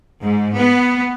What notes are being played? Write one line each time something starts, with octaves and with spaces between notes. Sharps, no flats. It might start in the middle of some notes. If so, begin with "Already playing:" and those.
G#2
B3